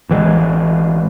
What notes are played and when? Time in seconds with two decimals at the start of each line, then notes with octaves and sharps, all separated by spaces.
0.09 A1 E3 F#3 G#3